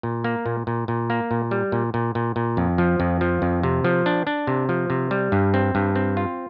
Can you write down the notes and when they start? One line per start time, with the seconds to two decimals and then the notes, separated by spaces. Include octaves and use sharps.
0.03 A#2
0.24 A#3
0.46 A#2
0.67 A#2
0.88 A#2
1.10 A#3
1.31 A#2
1.51 G3
1.72 A#2
1.94 A#2
2.15 A#2
2.36 A#2
2.57 F2
2.78 F3
3.00 F2
3.21 F3
3.42 F2
3.63 C3
3.84 F3
4.06 D4
4.27 D4
4.47 C3
4.69 F3
4.90 C3
5.11 G3
5.32 G2
5.54 C4
5.75 G2
5.96 C4
6.17 F4